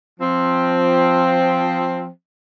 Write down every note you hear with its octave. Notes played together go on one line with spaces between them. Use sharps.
F3 C4